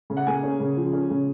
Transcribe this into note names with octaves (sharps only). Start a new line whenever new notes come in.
C#3
F#5
A#3 G#4 G#5
C#4
C#3
F3
C#4
C#3